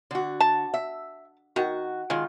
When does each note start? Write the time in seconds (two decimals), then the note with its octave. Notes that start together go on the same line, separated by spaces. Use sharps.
0.11 D3 F#4
0.40 A5
0.74 E5
1.56 D#3 F#4
2.10 D#3 G#3 F4